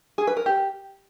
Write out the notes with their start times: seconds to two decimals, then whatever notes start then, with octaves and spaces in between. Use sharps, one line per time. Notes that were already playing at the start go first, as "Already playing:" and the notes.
0.18 G#4
0.27 B4
0.37 A#4
0.46 G4